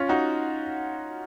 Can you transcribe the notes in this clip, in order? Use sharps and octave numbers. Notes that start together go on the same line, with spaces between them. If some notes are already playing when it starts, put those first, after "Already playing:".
Already playing: C#4 F4
D#4 F#4